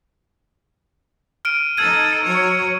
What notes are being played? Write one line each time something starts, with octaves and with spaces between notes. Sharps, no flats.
F6 D7 D#7
D#4 A4 E6 G#6 D#7
F#3 C#5